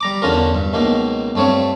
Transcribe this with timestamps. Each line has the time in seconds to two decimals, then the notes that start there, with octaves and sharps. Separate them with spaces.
0.01 G3 A#5 D6
0.22 E2 D3 C#4 F4 A#4
0.54 G2
0.73 C#2 B2 D#3 A#3
1.35 G2 A3 C4 C#5 F5